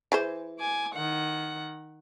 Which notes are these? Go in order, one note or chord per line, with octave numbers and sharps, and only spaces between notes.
E3 G#4 C5
G#5 D6
D#3 F#5